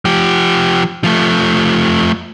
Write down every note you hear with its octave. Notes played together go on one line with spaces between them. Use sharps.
F3 G4
F3 A3